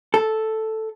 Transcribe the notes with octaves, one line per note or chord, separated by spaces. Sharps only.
A4